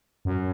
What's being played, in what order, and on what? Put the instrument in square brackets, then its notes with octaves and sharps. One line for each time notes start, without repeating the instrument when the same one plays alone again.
[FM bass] F#2